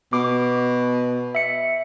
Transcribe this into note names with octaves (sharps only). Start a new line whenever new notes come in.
B2 D6
E5 C#7